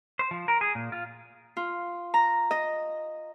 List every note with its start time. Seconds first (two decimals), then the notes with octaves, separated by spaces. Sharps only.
0.19 C5
0.31 F3
0.48 A#4
0.61 G#4
0.75 A#2
0.92 F4
1.57 F4
2.14 A#5
2.51 D#5